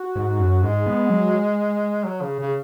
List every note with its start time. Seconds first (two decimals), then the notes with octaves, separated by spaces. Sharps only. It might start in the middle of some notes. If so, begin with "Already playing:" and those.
Already playing: F#4
0.16 G#2
0.40 F#2
0.63 G#2 G#3
0.86 B3
1.10 F#3
2.05 F#3
2.22 C#3
2.40 C#3